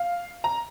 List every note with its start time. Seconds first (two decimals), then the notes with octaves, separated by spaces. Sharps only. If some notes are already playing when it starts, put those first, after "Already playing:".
Already playing: F5
0.44 A#5